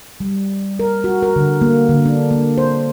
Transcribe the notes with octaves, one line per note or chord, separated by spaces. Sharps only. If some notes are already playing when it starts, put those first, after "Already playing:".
G3
A#4
F#4
A#4
D3
A#3
D3
D4
A#3
C5